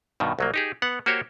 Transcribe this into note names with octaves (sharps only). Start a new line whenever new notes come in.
G2 B2 D#3
C2 F#3 A#3
D#4 G4 G#4
B3 F#5
A#3 F#4 G4 C5 C#5